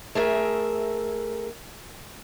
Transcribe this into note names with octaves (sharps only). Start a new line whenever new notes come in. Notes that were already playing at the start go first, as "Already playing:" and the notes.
A3 G#4 A#4 E5